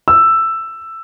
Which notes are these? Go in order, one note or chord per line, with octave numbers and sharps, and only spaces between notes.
E6